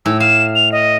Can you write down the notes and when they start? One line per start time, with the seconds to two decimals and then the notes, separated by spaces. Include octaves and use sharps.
0.06 A2 E6
0.20 F5 E7
0.55 F7
0.72 D#5